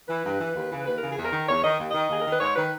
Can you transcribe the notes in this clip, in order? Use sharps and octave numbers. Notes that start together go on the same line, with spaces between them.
E3 B4
G2
E3
D#2
C#3 E3
D#2 B4
C#3 E3 A#4
G#4
E2
A#4
D#3
E2 C#5
D#3 D#5
D#2
D#3 D#5
D#2 G#4
D#3 A#4
B4
G#2 C#5
D#3 B4